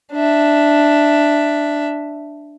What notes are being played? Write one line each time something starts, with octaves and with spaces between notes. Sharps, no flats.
D4 E5